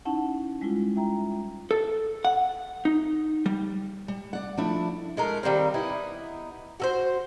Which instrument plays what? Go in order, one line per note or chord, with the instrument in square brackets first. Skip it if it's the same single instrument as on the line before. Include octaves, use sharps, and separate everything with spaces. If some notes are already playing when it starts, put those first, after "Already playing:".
[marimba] C#4 D#4 E4 F#5 A5
G3 G#3 C#4 E4 F4
E5 G5 A#5
[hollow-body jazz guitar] A4
F#5
D#4
G3
[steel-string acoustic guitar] G3
D5 F#5
F3 A3 D4 E4
[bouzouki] G#3 A3 A#4
D#3 G3 A#3 C4
B3 D#4 E4
F#4 A4 C5